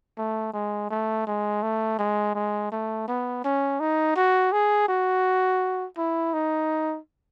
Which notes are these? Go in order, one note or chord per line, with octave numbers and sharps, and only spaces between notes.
A3
G#3
A3
G#3
A3
G#3
G#3
A3
B3
C#4
D#4
F#4
G#4
F#4
E4
D#4